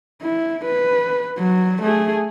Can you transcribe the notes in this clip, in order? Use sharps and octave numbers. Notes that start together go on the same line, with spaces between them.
E4
B4
F#3
A3 G#4